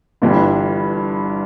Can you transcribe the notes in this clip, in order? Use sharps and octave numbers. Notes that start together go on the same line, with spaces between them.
G1 G2 E3 G3